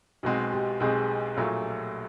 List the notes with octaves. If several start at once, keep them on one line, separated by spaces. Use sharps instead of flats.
B1 B2 G#3 C4 F#4
G4
B1 B2 G#3 C4 G#4
A#1 A#2 F#3 A3